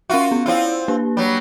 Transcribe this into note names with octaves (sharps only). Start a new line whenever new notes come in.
C#4 F4 F#4 E5
B3 C#4
C4 E4 F4 D5 E6
A#3 D4 B4
F#3 G3